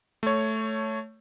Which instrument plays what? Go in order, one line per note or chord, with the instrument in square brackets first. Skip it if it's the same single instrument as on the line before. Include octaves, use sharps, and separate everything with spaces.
[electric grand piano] A3 C#5